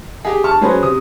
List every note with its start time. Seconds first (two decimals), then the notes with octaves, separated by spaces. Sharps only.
0.25 G4 G#4
0.44 A5 C#6 F6
0.61 F#3 C#4 G#4 B4 C5
0.82 C3 D#6